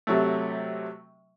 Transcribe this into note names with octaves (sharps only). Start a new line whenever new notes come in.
C3 F#3 A3